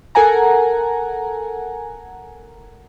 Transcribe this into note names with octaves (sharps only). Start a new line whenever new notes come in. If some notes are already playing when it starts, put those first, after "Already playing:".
A4 A#4 F#5 G#5 A#5